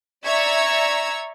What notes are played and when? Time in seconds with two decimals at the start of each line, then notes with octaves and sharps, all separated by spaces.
0.24 D5 E5 A#5 C#6 E6 G#6